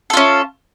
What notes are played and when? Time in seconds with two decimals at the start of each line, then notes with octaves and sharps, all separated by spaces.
0.10 A4
0.13 F4
0.17 C#4